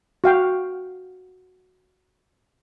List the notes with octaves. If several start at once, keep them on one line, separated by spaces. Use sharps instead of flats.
F#4 F5 G5